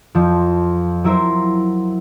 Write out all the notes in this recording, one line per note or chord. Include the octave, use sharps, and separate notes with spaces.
F2 F3
F#3 E4 A#4 C5